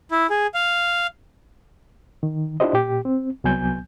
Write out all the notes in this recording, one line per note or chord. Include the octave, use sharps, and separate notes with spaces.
E4
G#4
F5
D#3
D4 E4 F4 G4 C5 D#5
A#2 G4
C4
C2 F#3 B3 G#5 G6